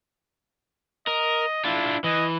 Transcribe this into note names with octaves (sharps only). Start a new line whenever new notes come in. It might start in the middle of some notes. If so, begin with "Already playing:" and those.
A#4 D#5
D4 E4 F4
E3 D#5